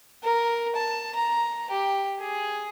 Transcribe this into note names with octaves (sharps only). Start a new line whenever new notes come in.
A#4
A5
A#5
G4
G#4